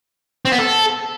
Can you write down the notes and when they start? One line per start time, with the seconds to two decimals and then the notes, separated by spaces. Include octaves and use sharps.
0.45 C4
0.52 B3
0.59 A4